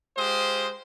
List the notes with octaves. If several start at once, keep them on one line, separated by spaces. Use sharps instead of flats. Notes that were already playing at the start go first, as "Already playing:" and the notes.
G#3 F4 G4 C5 D#6